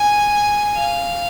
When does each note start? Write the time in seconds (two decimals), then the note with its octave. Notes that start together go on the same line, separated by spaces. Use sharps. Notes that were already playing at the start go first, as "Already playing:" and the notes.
Already playing: G#5
0.76 F5